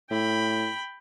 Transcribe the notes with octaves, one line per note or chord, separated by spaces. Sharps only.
A2 G5 B5